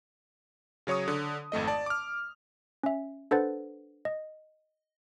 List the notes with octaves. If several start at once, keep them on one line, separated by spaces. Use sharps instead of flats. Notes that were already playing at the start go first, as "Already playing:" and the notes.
C#3 F#3 C#5 C#6 D#6
D3
G#1 F2 A3 D#5
D5 A5
D6 F6
C#4 E5
D4 A4 B4 C5 F#5 A6
D#5